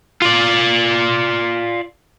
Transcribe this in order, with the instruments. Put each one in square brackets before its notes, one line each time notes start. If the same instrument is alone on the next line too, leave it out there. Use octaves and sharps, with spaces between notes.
[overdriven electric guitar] F4 D5